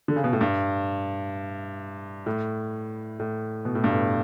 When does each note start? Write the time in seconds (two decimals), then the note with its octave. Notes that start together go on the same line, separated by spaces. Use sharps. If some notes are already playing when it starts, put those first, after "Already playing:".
0.08 D3
0.16 C#3
0.24 B2
0.33 A2
0.41 G2
2.26 A2
3.19 A2
3.65 B2
3.75 A2
3.84 G2
3.94 A2